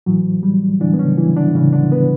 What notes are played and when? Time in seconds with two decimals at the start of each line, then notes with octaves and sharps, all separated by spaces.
0.06 A2 E3 F#3
0.43 G3
0.80 A2 D3 E3 D4
0.94 B3
0.99 C#3 C#4
1.17 E3 E4
1.36 D3 D4
1.54 A2 C#3 E3 C#4
1.73 D3 D4
1.92 B3 B4